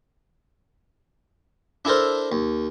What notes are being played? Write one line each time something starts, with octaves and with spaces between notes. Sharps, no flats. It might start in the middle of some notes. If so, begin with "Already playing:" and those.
D4 E4 A4 A#4 C5
D#2